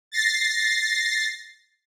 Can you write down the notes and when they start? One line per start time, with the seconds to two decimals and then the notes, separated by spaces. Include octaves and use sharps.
0.12 A6 A#6 C7